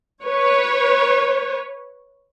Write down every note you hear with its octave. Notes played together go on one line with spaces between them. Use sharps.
B4 C#5